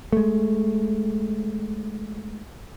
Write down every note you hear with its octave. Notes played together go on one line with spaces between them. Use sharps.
G#3 A3